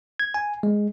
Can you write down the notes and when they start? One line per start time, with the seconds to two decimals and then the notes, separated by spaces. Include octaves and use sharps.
0.20 G#6
0.34 G#5
0.63 G#3